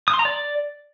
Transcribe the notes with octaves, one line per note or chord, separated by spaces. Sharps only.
D#6
C6
A#5
D5